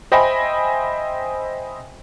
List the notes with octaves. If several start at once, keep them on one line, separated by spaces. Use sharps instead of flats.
C5 D#5 E5 G5 G#5 B5